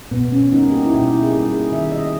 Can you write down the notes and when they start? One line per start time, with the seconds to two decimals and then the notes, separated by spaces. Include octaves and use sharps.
0.11 B2 B3
0.32 C#4
0.51 G3 A#3 D#4
0.72 G4
0.85 E4
0.92 B2 G4
1.12 E4
1.23 G#4
1.33 G3 G4
1.36 A#3
1.52 G#4
1.72 D#3 E5
1.92 D#5
2.03 D#5